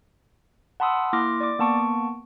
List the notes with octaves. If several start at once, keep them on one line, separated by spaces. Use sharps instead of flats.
F#5 A5 B5 C6 D#6 E6
A#3 E4 C6 D6 F6 A#6
D5 D6
A#3 B3 A5 C#6 D7